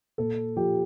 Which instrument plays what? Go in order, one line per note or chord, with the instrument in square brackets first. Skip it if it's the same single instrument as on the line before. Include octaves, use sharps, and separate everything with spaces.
[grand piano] A#2 A4
F3 G4